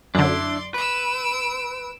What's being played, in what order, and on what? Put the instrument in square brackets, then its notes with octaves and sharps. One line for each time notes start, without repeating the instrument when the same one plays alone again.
[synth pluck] F#2 D3 [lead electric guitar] D4 E4 [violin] D5 C6
[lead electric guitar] B4 [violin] E6 D7